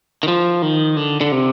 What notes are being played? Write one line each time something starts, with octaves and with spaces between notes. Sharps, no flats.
D#3
F3
D#3
D3
D3
C3